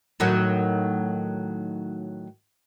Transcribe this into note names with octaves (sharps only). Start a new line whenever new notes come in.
A2 D#3 F#3